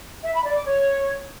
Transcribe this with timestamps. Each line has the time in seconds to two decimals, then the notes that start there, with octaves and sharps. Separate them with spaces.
0.22 E5
0.33 B5
0.43 D5
0.54 D6
0.65 C#5